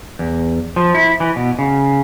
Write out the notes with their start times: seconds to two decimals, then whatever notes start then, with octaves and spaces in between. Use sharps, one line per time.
0.19 E2
0.76 F3
0.95 E4
1.20 E3
1.36 B2
1.59 C#3